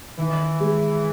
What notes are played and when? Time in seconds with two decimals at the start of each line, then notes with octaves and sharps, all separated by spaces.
0.18 D#3 E3
0.60 G#3